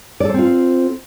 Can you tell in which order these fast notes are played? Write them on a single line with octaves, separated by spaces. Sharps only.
D5 A4 C5 C4 F4